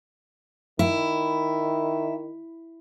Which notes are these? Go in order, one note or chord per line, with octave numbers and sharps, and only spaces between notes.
D#3 E4